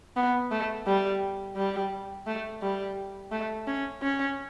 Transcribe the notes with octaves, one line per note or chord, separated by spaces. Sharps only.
B3
A3
G3
G3
A3
G3
A3
C#4
C#4